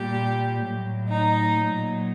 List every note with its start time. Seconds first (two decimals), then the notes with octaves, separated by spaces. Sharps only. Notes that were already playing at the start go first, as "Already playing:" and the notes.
Already playing: A#2 G3 G4
0.60 A2 F#3
1.09 D#4
1.58 A#2 F#3